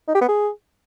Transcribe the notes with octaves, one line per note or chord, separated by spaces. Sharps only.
D#4
G4
B3
G#4